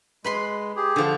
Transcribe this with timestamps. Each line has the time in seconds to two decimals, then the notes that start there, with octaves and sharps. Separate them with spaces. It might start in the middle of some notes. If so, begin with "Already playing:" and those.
0.24 G#3 B4 B5 C6
0.76 G4 G#4
0.96 D3 F3